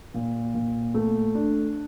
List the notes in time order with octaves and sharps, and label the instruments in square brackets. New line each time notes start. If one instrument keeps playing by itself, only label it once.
[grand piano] A#2
A#2
A3
D4